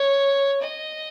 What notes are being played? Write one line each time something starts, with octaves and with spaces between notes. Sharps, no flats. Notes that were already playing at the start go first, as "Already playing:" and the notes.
Already playing: C#5
D#5